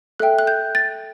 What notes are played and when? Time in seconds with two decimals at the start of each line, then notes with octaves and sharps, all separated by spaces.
0.20 A4 E5 G5 F#6
0.39 F#6
0.47 G6
0.75 A6